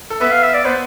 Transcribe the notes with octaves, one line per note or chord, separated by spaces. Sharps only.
A4
B3 B4 E5
F5
E5
D5
B3 B4 C5